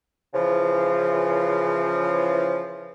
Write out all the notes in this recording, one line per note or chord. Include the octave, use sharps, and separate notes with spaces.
C#3 E3 F3